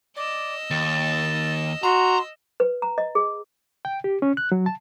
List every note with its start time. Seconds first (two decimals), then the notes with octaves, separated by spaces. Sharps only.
0.16 D5 D#5 E6
0.70 D#2 A6
1.83 F#4 A#5 C6
2.60 B4
2.82 A#5
2.98 D#5
3.15 G#4
3.85 G5
4.04 G4
4.22 C#4
4.37 F#6
4.52 F#3
4.66 A5